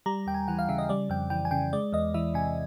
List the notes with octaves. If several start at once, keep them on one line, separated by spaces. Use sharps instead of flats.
G3 A#5
D#2 G5
G#5
E3 F#5
F5
C#3 E5
D#5
G3 D5
F2 G5
E3 G5
G#5
C#3 G5
G#3 D5
E2 D#5
E3 E5
C3 G#5